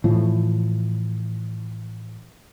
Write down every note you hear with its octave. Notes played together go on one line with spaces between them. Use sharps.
A2 E3 F3